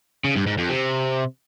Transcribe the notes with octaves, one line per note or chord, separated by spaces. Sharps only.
C#3
G2
G#2
F2
C3